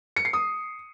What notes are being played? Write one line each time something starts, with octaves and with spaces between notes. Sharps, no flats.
C#7
C7
D#6